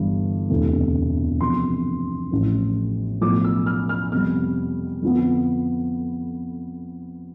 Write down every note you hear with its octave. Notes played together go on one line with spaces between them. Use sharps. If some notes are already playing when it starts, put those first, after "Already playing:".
Already playing: G1 G2 E3
E1 D2 C3 E3 A3
E2 C3 F3 C6
A1 A2 F3 A3
B1 A2 F3 A3 D6
E6
F6
F6
F2 C3 G3 B3 F6
F2 D3 F3 B3